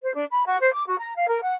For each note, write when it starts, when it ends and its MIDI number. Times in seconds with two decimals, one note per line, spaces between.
0.02 0.12 72
0.13 0.24 62
0.30 0.44 83
0.46 0.56 66
0.60 0.72 72
0.73 0.84 86
0.86 0.98 66
0.99 1.12 82
1.16 1.26 77
1.28 1.39 70
1.41 1.54 78